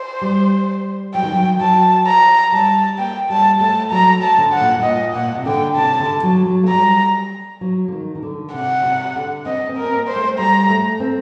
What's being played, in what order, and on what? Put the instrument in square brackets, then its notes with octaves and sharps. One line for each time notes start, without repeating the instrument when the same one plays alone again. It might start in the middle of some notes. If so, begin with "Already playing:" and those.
Already playing: [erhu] C5
[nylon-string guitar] G3
[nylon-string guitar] F#3 [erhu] G5
[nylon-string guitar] D#3
F#3
[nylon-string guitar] F#3 [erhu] A5
[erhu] A#5
[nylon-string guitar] G3 [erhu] A5
[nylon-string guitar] A#3 [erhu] G5
[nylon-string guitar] G3 [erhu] A5
[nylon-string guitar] A3 [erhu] A5
[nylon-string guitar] F#3 [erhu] A#5
[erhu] A5
[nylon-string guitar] D3
[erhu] F#5
[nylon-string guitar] A#2
A2
[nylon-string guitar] A#2 [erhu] D#5
[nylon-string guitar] A#2 [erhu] F#5
[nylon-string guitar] C3
[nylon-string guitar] D3 [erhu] G5
[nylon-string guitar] C3 [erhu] A5
[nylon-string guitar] D3
F#3
F#3
A3
[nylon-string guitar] G3 [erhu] A#5
[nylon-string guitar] F#3
D3
D#3
D#3
D3
[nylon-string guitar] C3 [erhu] F#5
[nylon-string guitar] C3
D3
[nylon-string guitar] C4 [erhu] D#5
[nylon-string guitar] C4
[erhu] A#4
[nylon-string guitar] C4
A#3
[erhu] C5
[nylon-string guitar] A3
[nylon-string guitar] G3 [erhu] A#5
[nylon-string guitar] A3
C4